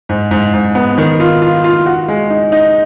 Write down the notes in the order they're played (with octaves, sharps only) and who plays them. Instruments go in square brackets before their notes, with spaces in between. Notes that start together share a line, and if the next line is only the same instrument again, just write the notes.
[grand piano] G#2
G#2
G#2
B3
D#3
F4
F4
F4
F#4
G#3
D#4
D#4